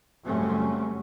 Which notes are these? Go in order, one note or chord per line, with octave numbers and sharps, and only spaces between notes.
F#1 F#3 G3 A3 C4 C#4